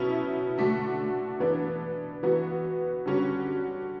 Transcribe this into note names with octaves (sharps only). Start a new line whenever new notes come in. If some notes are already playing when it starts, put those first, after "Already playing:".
Already playing: B2 F#3 C#4 E4
D3 A3 D4 F#4
E3 B3 D4
E3 B3 F#4
D3 G3 C#4 F#4